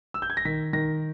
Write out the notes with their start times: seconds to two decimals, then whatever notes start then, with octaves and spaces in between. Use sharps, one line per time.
0.14 E6
0.22 G6
0.30 G#6
0.37 A#6
0.45 D#3 B6
0.73 D#3 A#6